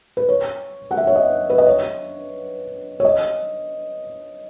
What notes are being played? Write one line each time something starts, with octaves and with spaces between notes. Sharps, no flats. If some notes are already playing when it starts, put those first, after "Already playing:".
B4
C#5
F#5
E5
C#5
D#5
B4
D#5
C#5
C#5
D#5